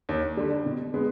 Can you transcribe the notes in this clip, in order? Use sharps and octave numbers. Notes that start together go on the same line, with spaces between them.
D#2
D3 G3
B2
G#3 B3